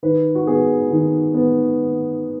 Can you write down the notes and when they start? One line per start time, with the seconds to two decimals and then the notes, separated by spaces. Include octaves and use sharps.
0.03 D#3 B4
0.35 F#4
0.47 B3 G#4
0.91 D#3
1.34 B3